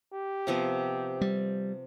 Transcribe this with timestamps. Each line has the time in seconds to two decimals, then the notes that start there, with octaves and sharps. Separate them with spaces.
0.13 G4
0.47 C3 F3 B3
1.21 G3